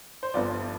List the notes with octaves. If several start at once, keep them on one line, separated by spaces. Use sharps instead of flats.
C5
G1 G2 F3 D5